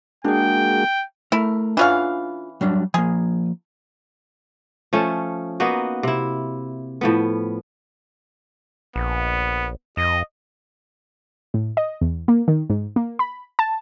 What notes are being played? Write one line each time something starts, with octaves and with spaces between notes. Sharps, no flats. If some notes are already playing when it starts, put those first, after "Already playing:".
G#3 A#3 D4 F#4 G#4 G5
A3 E4 A#4
E3 C#4 D4 F4 F5 F#5
F#3 G3 D4
F3 A#3 G#4
F3 A3 C#4
A#3 B3 D#4 F#4
C3 E4
A2 F3 B3
A#1 B3
F2 D#5
A2
D#5
E2
A#3
D#3
G#2
A#3
B5
A5